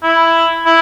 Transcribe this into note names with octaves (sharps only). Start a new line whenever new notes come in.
E4
E4